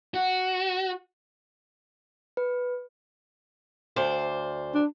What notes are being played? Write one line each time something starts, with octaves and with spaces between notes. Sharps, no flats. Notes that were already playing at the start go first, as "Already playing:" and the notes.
F#4
B4
D2 C5 D5
D4